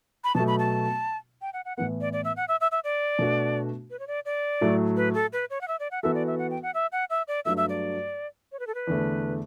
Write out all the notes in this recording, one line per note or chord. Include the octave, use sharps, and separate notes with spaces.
B5
B2 F#3 A3 A5
B5
A5
G5
F#5
F#5
A2 E3 B3 F#5
D5
D5
E5
F#5
E5
E5
E5
D5
B2 A3 D4 F#4
B4
C#5
D5
D5
A2 F#3 A3
B4
A4
B4
C#5
F#5
E5
D5
F#5
E3 B3 F#4 A4 E5
D5
E5
F#5
G5
F#5
E5
F#5
E5
D5
G2 F#3 A3 E5
E5
D5
C#5
B4
A4
B4
E2 D3 A3